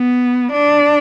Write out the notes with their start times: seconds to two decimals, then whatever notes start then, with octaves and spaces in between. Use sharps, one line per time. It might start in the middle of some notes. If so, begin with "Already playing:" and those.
Already playing: B3
0.52 D4